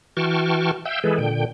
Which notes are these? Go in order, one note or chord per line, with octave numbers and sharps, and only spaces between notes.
E3 F#4 G5 A5 C#6 F6
E5 F5 G5 E6 G6
E3 G#3 G#4 A4 B4
A#2 D3 G5